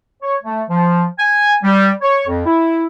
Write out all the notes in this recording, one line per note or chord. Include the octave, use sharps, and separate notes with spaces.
C#5
A3
F3
G#5
G3
C#5
F2
E4